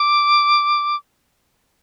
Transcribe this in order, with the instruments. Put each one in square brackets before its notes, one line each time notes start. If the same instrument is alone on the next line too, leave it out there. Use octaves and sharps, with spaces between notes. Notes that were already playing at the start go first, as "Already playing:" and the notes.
Already playing: [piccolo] D6